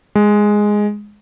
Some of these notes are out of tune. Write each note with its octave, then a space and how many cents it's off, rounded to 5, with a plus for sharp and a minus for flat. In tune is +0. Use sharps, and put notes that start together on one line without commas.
G#3 +0